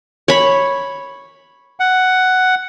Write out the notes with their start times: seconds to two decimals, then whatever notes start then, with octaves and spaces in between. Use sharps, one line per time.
0.28 C#5 B5
1.80 F#5